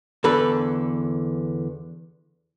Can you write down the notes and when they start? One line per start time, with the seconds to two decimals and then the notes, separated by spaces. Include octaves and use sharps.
0.24 E2 D3 A4 B4